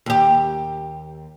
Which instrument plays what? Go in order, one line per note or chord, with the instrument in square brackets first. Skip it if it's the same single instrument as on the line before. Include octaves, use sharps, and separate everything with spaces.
[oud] D#2 G4